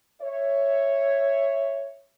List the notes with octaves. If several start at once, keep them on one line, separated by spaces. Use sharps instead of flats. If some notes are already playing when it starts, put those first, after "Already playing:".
C#5 E5